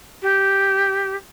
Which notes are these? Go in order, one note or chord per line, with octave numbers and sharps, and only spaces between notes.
G4